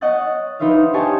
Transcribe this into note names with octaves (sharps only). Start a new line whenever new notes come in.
C#5 D#5 F#5 F#6 A6
D4 D#4 B4 C5 E5 F5
G4 C5 C#5 D#5 G#5 A5